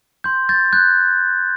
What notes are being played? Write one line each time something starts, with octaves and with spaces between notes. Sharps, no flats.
C6 G6
G6 A6
F#6 G6